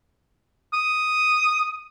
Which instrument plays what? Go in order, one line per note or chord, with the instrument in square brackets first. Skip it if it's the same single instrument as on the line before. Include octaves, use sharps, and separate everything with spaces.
[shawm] D#6